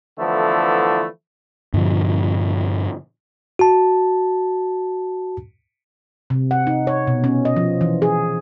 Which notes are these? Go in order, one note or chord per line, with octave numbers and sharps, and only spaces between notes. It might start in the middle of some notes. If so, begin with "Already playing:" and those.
D3 E3 F3 A3 B3 E4
G2 A#2 D3 F3
F#4 A5
C3
F#5
D#4
C#5
B2
C#4
D#5
F3
E3
G#4